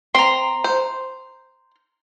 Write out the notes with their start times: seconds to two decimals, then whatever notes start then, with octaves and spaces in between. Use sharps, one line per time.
0.15 C4 A#5 C6
0.64 C5